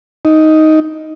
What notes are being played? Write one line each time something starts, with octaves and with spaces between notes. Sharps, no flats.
D#4